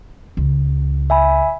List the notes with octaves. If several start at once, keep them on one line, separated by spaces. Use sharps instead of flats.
C#2
E5 G#5 B5